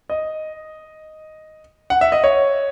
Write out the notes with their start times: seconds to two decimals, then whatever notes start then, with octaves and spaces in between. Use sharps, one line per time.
0.10 D#5
1.90 F#5
2.01 E5
2.12 D#5
2.24 C#5